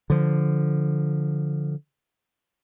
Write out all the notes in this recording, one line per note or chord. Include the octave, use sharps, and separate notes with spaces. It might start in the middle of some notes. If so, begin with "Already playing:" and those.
D3 F3